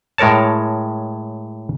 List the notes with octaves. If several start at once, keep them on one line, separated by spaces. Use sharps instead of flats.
A2 G#3 A#4 C#5 A5